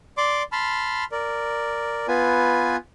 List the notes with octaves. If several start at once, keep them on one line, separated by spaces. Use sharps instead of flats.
D5 C6 D6
A5 B5 C6 F6
A#4 D5
B3 F4 B4 G#5